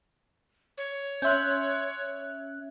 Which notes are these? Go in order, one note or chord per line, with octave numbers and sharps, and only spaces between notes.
C#5
C#4 E5 C6 F#6 G6